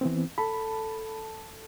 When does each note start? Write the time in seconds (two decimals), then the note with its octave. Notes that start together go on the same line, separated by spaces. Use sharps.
0.01 E3 B3 C4
0.38 A4 B5